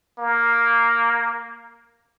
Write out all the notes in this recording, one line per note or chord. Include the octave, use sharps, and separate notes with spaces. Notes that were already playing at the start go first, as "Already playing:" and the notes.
A#3